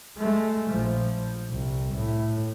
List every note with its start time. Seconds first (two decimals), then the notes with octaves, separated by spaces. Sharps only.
0.18 G#3 A3
0.70 A#1 F3
1.50 C2
1.95 A2